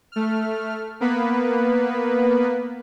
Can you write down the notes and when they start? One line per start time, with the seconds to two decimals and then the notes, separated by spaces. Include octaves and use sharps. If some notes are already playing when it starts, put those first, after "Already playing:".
0.12 A3 F6
1.00 A#3 B3 B4